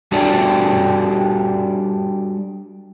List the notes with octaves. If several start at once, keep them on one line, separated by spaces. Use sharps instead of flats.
G3 D4 F#4 G4 A4 D5